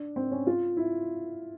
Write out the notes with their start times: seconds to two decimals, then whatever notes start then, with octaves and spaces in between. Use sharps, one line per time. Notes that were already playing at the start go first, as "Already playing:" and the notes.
Already playing: D4
0.16 C4
0.31 C#4
0.47 F4
0.77 E4